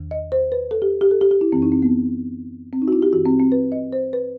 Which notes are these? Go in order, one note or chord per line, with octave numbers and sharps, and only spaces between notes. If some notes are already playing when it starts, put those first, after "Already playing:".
Already playing: E2 D#3
D#5
C5
B4
A4
G4
G4
A4
G4
G4
E4
F#2 E3 C4
D#4
C4
B3
C4
D#4
F#4
E4
G4
G2 E3 F#4
C4
C4
B4
D#5
C5
B4